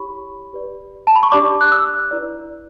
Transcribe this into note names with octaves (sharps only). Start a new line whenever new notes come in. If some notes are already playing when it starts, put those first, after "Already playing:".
Already playing: E4 G4 C#5 B5 C#6
G4 B4 D5
A5
B5
C#6
D4 G4 D5 D6
F#6
E6
E4 B4 D5